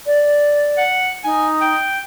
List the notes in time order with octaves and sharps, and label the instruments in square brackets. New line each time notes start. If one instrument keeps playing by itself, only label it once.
[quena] D5
[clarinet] F#5
[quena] D#4 [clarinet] G#5
[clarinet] G5